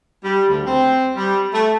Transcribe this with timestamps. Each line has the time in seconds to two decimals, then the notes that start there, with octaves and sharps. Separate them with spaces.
0.24 G3
0.49 D2
0.65 C4
1.16 G3
1.53 A3